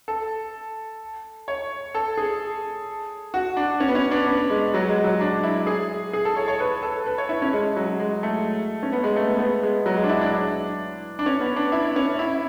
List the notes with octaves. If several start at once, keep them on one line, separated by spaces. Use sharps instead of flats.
A4
C#5
A4
G#4
F#4
D4
C#4
B3
C#4
D4
B3
G#3
F#3
G#3
F#3
D4
E4
G#4
G#4
A4
C#5
C#5
B4
A4
B4
C#5
E4
C#4
G#3
F#3
G#3
A3
C#4
B3
G#3
A3
B3
B3
G#3
F#3
G#3
D4
E4
D4
D4
C#4
B3
D4
E4
C#4
E4